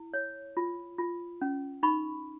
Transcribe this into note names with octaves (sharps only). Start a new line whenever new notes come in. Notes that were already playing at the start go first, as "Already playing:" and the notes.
Already playing: E4
C#5
F4
F4
C#4
D#4 B5 C#6